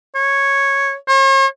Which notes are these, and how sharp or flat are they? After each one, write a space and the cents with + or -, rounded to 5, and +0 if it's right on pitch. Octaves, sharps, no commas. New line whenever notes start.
C#5 -5
C#5 -45